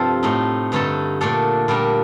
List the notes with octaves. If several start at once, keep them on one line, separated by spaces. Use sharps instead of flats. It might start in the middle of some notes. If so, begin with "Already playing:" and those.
Already playing: G2 C3 F3 C4 F4 G4 A4
A2 A3 D#4
G2 D3 A3 D#4 A4
A#2 A3 D4 A4
A#2 G3 D4 G4 A#4